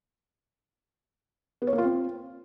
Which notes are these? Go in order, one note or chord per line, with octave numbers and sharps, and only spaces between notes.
B3
C#5
A#3
F4
C4